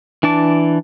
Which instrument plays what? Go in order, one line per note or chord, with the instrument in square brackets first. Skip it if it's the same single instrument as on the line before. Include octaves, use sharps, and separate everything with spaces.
[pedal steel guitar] E3 D4 A5 D6